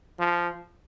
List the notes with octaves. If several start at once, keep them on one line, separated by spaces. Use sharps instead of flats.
F3